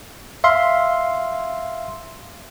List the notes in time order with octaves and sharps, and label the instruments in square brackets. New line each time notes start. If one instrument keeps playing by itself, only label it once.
[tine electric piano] E5 F5 C6